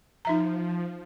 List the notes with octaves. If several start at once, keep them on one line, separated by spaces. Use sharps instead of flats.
F3 D#4 E5 A#5